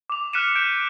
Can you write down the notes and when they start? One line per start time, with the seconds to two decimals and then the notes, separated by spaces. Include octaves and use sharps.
0.10 D6 F7
0.33 F6 F#6 B6 C#7 D#7 E7
0.55 G6 D7